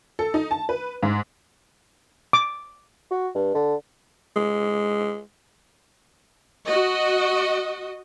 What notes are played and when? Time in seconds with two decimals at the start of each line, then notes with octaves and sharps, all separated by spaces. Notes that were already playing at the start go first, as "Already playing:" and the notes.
0.19 A4
0.34 D#4
0.51 A5
0.69 B4
1.03 G#2
2.33 D6
3.11 F#4
3.35 G2
3.55 D3
4.36 G#3
6.67 F#4 D#5